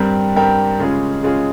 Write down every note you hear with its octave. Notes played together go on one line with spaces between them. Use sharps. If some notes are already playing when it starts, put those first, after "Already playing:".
Already playing: G2 G3 C4 G4 A#4
G2 G3 C4 G4 A#4
C#3 G#3 C#4 F4 G#4
C#3 G#3 C#4 F4 G#4